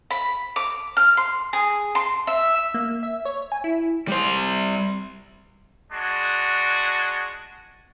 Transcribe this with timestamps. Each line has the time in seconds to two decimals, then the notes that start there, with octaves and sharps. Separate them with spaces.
0.11 B5
0.56 D6
0.97 F6
1.17 C6
1.53 G#4
1.95 C6
2.27 E5
2.74 A#3
3.03 E5
3.25 C#5
3.52 G#5
3.64 E4
4.08 G3 C5
5.92 G#3 D4 F#4